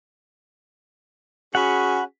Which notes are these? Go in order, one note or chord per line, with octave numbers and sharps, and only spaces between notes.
C#4 F#4 G#4 F#5 B5